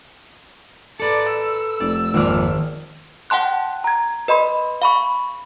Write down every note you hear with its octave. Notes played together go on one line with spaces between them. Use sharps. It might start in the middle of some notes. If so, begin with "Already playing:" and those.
A4 B4 D5
E6
F1 D5
G#1 F2 A#2 A#3 D5 F6
F#5 G5 A5 C6 F#6
A#5 G#6
B4 D#5 B5 C6
F5 B5 C#6